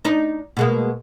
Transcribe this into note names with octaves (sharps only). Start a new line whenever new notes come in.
D4 D#4
B2 G#3 A#3